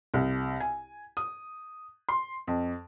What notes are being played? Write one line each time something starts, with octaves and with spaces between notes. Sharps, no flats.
C2
G#5
D#6
C6
F2